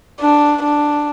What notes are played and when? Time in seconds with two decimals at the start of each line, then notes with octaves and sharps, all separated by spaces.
0.21 D4
0.63 D4